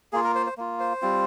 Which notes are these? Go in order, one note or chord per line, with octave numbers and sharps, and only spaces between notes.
A#3 F4 G#4
A#4
C5
C5
A#3 F4
C5
G3 C4 F4